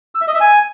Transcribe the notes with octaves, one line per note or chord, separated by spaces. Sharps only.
E6
E5
D#5
E5
G#5